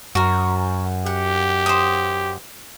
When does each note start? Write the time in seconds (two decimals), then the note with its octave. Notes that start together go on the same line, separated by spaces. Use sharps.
0.15 F#2 F#4 A#4
1.06 G4 F#5
1.66 C5 D#6